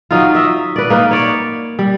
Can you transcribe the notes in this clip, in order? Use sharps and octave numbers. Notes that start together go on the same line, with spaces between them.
F#3 D#4 F4
D#5 E5
B4 D5
A#3 D#4 B4
C#5 D5
G3